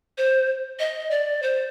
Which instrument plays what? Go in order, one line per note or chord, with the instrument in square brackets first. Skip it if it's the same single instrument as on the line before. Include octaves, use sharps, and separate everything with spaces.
[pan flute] C5
D#5
D5
C5